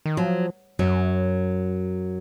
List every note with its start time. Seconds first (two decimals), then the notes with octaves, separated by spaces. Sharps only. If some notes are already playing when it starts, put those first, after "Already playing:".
0.06 D#3
0.17 F3 F#3
0.79 F#2 F#3